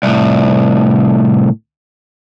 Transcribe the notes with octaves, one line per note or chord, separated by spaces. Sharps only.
C2 A2